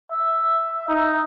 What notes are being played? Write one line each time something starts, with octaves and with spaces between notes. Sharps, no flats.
E5
D#4